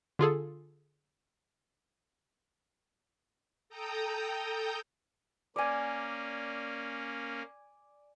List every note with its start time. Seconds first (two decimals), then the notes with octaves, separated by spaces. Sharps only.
0.19 D3 F4 G#4 A4
3.69 A4 G5 A#5 D#6 G6
5.56 A#3 C#4 D5 G#5